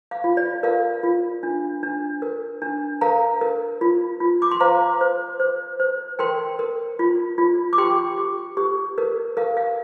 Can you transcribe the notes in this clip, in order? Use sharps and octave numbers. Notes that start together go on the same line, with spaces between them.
F5
F4
D5
A#4 F5
F4
D4
D4
A#4
D4
A#4 F5 A#5
A#4
F4
F4
D6
C6
C5 F5 A#5
C5
C5
C5
A#4 G5 C6
A#4
F4
F4
D6
G4 G5 C6
G4
G4
A#4
A#4 F5
F5